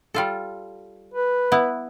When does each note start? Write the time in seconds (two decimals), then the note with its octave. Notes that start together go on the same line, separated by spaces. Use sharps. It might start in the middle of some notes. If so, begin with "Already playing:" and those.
0.14 G3 F4 A4
1.14 B4
1.52 B3 E4